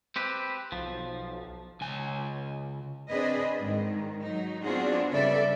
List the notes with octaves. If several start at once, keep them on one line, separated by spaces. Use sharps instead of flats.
C4 G4 B4
B1 F3
C#2 G#5
C4 D4 G#4 B4 D#5
G#2 D#3
F#3 D#4
B3 C4 D4 F4 F#4 G#4
C#3 G3 A4 B4 D5 E5